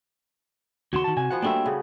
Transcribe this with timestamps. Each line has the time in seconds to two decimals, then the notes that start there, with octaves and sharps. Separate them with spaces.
0.93 D#2 C#3 F#4 C6 E7
1.04 D#3 A5
1.17 C3 G#5
1.31 D#3 F3 B3 F#5
1.42 G3 A3 A#3 C4 D4 E5
1.65 C#3 B3